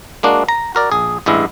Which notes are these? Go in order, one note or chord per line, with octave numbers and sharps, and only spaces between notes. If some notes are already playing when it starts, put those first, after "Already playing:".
G#3 A#3 D4 F#4
A#5
F#4 A#4 D5
A#1 G#4
A1 G2 G#3 E4